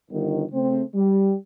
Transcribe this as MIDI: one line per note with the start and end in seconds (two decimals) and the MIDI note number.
0.10 0.43 31
0.10 0.43 51
0.51 0.81 49
0.51 0.81 57
0.51 0.81 60
0.94 1.33 55